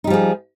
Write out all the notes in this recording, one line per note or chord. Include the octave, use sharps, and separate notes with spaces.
F3 G3 D#4 G#4